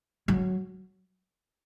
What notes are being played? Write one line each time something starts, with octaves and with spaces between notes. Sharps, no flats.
F#3